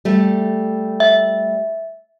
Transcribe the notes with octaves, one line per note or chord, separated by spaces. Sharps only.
G3 A3
E5